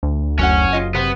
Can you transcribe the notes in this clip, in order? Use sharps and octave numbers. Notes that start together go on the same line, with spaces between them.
D2
F#1 C#4 F#4 C#5 F#5
F4 D#5
C3 B3 C5